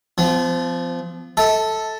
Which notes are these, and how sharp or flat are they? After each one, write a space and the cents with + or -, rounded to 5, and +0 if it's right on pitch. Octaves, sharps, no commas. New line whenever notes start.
F3 -15 B3 +45
A4 +0 E5 -45 A5 +0